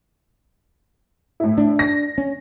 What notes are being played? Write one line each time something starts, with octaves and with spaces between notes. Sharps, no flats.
A2 E4
D4
A#6
C#4